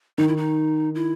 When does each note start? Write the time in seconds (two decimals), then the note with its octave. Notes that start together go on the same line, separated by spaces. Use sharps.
0.18 D#3 D#4
0.28 E4
0.37 D#4
0.95 E4